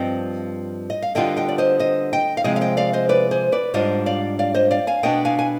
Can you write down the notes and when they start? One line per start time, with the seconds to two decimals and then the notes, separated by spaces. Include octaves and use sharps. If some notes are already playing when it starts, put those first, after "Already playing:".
Already playing: G2 F3 C4 D#5 G5
0.90 D#5
1.02 F5
1.15 D3 G3 B3 F4 D#5 G5
1.37 D#5 G5
1.48 D5
1.58 C5 D#5
1.79 C5 D#5
2.13 D#5 G5
2.37 F5
2.44 C3 F3 G#3 D#5 G5
2.56 F5
2.61 D#5 G5
2.77 D5 F5
2.93 C5 D#5
3.09 B4 D5
3.31 G#4 C5
3.52 B4 D5
3.74 G#2 G3 D4 F4 C5 D#5
4.06 D5 F5
4.39 D5 F5
4.54 C5 D#5
4.71 D5 F5
4.87 F5 G#5
5.03 B2 B3 D4 D#5 G5
5.25 F5 G#5
5.39 G#5